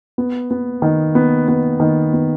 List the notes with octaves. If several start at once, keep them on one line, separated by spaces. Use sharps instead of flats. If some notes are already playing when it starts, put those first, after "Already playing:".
B3
B3
D#3
B3
B3
D#3
B3